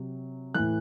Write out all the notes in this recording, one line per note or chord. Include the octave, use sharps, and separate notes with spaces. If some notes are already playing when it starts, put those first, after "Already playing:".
Already playing: C3 F#3
A2 E3 F#6